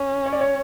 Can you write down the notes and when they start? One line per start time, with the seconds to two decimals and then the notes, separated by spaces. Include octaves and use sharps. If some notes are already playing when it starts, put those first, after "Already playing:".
Already playing: C#4
0.26 C#5
0.33 D5
0.41 C#5